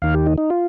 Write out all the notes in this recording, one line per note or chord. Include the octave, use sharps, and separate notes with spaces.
D#2 D#3 F5
G4
D#4
D#4
F4